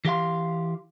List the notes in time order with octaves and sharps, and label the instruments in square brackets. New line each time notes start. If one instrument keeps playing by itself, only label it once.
[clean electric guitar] E3 G4 F5 C6